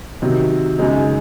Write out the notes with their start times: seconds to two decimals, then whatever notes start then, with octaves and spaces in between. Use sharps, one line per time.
0.22 C3 D#3 F#3
0.79 F#2 C#3 G#3 D#4